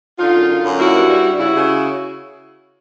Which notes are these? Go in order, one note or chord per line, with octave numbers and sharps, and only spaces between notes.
D3 D#4 F4
F#2
D3
F#2
A#3 E4 F#4
G2
G3
G2
C#3 E4 F#4
C#3